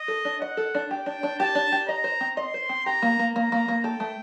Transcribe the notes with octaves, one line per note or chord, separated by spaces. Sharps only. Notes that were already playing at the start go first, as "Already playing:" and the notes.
Already playing: D#5
A4
D4
D#5 F#5
A4
D4
G4 G5
D4
D4
G4 A5
D4
G4
D#5 A#5
C5
C4
D#5 C6
C5
C4
G4 A#5
A#3
A#3
A#3 A#5
A#3
A#3
A4 G5
A3